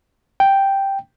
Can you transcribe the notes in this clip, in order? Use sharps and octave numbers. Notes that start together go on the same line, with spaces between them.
G5